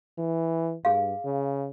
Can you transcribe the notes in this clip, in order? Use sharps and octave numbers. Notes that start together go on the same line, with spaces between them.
E3
G2 G#4 F5
C#3